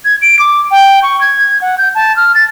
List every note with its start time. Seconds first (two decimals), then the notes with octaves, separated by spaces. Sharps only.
0.05 G#6
0.22 D7
0.39 D6
0.71 G5
1.03 C#6
1.21 G#6
1.62 F#5
1.78 G6
1.95 A5
2.16 F6
2.35 A6